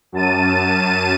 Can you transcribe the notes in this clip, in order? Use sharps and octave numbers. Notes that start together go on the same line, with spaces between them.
F#2 A5 D#7